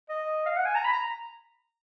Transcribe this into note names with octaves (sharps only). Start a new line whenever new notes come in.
D#5
F5
F#5
G#5
A#5
B5
A#5